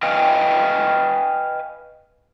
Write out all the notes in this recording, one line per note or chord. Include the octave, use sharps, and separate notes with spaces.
B4 D#5 F5 G5 G#5